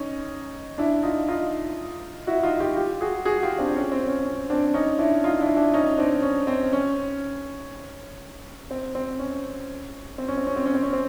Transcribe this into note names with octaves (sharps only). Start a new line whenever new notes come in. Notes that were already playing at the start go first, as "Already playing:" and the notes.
Already playing: C#4 D#4
D4 E4
D#4 F4
D#4 F4
E4 F#4
D#4 F4
F4 G4
F4 G4
F#4 G#4
F#4 G#4
F4 G4
C4 D4
C#4
C4
C#4
C#4
C4 D4
C#4 D#4
D4 E4
D#4 F4
D4 E4
D4 E4
C#4 D#4
C4 D4
C#4
C4
C#4
C4
C4
C#4
C4
C#4
C4
C#4
C4
C#4
C4
C#4
C4